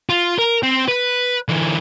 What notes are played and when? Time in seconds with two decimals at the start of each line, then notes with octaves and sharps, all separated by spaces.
0.09 F4
0.39 A#4
0.63 C4
0.88 B4
1.49 D3 E3